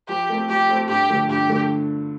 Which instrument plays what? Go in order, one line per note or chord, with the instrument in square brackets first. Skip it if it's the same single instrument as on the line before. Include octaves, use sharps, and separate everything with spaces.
[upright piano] F3 [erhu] G4
[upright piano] A3 C4 A4 C5
[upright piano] F3 [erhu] G4
[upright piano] A3 C4 A4 C5
[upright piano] G2 [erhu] G4
[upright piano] D3 F3 A3
[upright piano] G2 [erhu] G4
[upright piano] D3 F3 A3